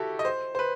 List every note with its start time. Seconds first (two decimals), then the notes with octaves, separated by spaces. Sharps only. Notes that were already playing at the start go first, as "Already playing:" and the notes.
Already playing: E4 F#4 G4 A4
0.19 D#5
0.25 C5
0.55 C5
0.59 B4